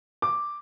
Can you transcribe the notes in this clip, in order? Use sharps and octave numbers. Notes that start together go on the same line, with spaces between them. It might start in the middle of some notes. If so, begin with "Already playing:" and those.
D6